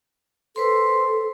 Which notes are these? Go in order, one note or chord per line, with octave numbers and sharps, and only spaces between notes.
A4 B4 C5 C6